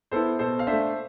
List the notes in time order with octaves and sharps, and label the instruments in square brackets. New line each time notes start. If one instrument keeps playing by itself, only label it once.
[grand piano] B3 E4 A4 C5
B2 A4 C5
F5
A3 D4 C5 E5